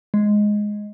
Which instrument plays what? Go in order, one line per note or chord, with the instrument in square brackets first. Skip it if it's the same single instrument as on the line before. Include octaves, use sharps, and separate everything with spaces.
[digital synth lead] G#3